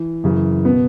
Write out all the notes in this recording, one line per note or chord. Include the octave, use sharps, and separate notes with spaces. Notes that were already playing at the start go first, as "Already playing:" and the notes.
Already playing: E3
F#2 C#3 E3
B2 B3